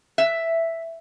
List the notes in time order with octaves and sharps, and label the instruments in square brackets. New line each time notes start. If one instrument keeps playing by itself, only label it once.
[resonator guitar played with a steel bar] E5